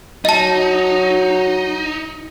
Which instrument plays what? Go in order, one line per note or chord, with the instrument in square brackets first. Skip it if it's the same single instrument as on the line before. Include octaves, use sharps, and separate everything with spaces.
[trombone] F#3 [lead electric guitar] D#4 [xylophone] D#5 A5